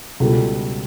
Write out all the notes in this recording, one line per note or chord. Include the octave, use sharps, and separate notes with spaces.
C#2 B2 G3 A4